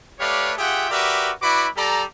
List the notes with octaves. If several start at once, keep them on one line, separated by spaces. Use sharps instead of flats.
A3 G4 B4 C#5 D5 F5
F4 G4 G#4 E5 F#5 G5
F#4 G4 A#4 B4 D5 E5
E4 F#4 B4 D5 B5 D6
G3 G4 A4 D5 A#5